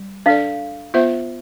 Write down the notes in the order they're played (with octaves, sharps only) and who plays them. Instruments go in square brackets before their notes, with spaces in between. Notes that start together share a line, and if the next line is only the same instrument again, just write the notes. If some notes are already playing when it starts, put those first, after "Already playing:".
Already playing: [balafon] G3
[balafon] D4 A4 D5 [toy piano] F5
[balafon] B3 F4 C5 E5